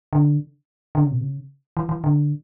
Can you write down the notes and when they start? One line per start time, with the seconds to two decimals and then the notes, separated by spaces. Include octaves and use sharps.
0.13 D3
0.95 D3
1.03 C#3
1.11 B2
1.21 C#3
1.77 E3
1.89 E3
2.04 D3